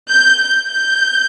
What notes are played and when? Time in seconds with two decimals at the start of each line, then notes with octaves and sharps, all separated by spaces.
0.11 G6
0.42 G6
0.73 G6